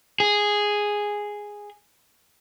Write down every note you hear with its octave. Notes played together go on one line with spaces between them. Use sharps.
G#4